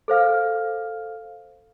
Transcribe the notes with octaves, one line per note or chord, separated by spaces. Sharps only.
A4 C5 F5 F6